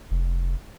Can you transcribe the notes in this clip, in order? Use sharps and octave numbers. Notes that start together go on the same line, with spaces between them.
F1